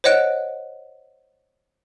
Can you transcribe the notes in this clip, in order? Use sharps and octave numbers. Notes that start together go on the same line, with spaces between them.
C5 C#5 D#5 F#5 F#6 D7